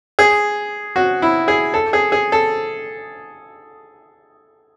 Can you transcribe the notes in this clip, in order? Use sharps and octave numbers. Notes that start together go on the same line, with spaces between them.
G#4
F#4
E4
G#4
A4
G#4
G#4
A4